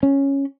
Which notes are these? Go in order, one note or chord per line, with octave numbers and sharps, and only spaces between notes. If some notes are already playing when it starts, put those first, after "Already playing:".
C#4